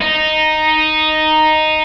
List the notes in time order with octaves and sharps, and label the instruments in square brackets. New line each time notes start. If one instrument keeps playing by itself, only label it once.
[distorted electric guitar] D#4